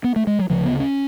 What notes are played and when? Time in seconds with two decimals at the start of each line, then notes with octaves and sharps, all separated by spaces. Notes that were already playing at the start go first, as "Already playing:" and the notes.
0.04 B3
0.16 A3
0.27 G#3
0.39 F#3
0.50 D2 C#3 F3
0.65 B3
0.80 C#4